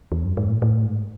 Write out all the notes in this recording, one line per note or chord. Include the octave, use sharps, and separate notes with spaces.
E2
F#2
G#2
A2
A2
G#2